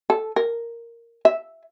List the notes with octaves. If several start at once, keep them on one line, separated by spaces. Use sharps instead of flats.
A4
A#4
E5